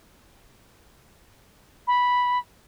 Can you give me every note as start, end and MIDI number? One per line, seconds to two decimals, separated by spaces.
1.87 2.38 83